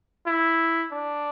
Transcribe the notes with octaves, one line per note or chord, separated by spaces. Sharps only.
E4
D4